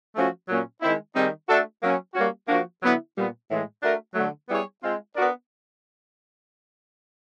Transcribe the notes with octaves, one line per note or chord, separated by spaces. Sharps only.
F3 A3 C#4 F#4
A#2 F#3 A#3 C#4
D#3 G#3 C4 E4
D#3 G3 C4 D#4 G#4
A3 D4 F#4 A4
F#3 A#3 C#4
G3 A#3 C#4 F#4
F3 A#3 D4 F#4
D3 F#3 B3 E4
A#2 G3 B3
A2 E3 G#3
A3 D4 F#4 A#4
D3 F#3 A3
G3 B3 E4 G#4 C#5
G#3 C4 F4
B3 D4 F#4 A#4 D5